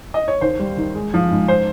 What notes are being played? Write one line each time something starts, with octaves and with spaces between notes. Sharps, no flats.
D#5
C#5
D#2 C5
G3
D#3
G#3
F3
G#2
C5